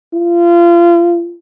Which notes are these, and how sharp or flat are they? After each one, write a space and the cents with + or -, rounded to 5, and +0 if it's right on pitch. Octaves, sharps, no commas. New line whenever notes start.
F4 -30